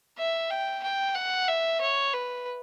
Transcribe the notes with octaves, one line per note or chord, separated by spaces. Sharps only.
E5
G5
G5
F#5
E5
C#5
B4